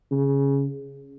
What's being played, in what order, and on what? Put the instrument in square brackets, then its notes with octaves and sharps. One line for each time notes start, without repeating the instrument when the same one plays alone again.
[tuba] C#3